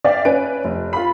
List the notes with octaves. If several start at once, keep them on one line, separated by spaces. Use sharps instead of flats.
D5 E5 F5 G5
C#4 B4 G#5 D7
F1
F4 B5